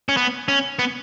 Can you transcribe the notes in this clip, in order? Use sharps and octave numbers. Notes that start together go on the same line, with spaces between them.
C#4
B3
C#4
B3